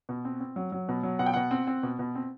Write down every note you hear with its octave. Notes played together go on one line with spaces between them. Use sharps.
B2
C4
C4
F#3
F#3
B2
F#3
B2 F#5
G5
B2 F#5
C4
C4
B2
B2
C4